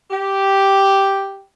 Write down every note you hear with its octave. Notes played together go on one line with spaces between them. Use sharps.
G4